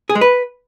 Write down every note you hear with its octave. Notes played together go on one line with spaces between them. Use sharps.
G#4
G#3
B4